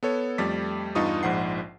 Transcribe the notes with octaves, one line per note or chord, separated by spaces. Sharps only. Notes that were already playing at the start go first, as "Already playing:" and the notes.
B3 A4 C#5
F2 G3 A3 D6 A6 B6
E2 G2 D#4 F4 C#6 D#6
A#1 G#2 F3 F#5 C7